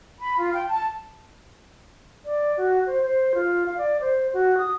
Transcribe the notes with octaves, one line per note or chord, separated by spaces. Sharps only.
B5
F4
G5
A5
D5
F#4
C5
C5
F4
F5
D5
C5
F#4
D#6